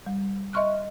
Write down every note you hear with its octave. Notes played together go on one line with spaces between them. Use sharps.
G3
D#5 E5 C6 C#6 F6 F#6